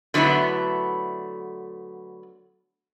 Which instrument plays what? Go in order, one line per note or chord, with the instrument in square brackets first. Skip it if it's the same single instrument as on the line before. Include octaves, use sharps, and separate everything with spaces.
[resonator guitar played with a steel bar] D3 F#3 A3 B3 E4